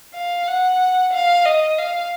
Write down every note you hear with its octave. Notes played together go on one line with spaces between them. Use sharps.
F5
F#5
F5
D#5
F5